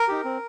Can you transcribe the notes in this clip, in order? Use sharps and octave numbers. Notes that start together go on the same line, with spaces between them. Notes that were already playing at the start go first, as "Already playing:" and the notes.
Already playing: A#4
D#4 G4
C4